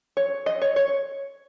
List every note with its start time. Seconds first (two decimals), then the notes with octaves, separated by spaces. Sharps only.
0.17 C#5
0.46 D#5
0.62 C#5
0.76 C#5